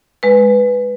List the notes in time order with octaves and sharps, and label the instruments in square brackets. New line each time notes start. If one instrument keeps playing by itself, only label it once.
[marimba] G#3 B4